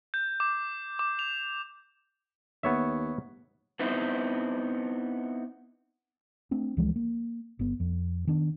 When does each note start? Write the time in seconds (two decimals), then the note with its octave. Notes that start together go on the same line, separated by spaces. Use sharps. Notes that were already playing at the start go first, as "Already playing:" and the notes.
0.14 G6
0.40 D6
0.99 D6
1.19 F7
2.63 D#2 B3 C#5 E5
3.79 B3 C4 D#4 E4
6.51 A3 C4 D4
6.77 C#2 E3 F3 G#3
6.96 A#3
7.59 G1 B3
7.80 F2
8.27 D#3 B3 D4